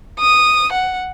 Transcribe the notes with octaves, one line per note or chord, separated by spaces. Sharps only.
D#6
F#5